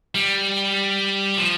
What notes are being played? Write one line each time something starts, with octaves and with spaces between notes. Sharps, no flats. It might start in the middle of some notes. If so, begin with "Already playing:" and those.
G3
F3